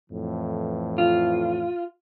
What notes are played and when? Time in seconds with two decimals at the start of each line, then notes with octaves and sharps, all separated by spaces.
0.11 F2 A2 E3
0.98 F4